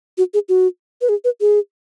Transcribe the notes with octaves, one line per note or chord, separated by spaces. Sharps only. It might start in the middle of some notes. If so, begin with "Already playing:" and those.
F#4
G#4
F#4
B4
G#4
B4
G#4